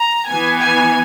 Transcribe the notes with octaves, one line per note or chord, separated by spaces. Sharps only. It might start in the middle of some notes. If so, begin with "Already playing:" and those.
Already playing: A#5
E3 B3 G#5
G#5